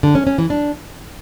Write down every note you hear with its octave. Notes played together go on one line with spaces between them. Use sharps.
D3
C#4
C#4
E3
D4